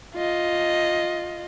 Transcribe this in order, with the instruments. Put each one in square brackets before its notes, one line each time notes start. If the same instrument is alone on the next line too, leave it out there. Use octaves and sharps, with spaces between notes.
[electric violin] F4 D#5